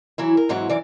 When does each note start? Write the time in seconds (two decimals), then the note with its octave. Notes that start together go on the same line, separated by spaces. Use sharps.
0.18 E3 F#3 E4
0.37 A#4
0.49 G#2 E3 F#3 C4 F#4
0.69 F#2 E3 D5